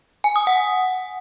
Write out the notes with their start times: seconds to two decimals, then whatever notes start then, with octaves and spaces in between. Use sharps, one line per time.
0.24 G#5
0.36 D#6
0.47 F#5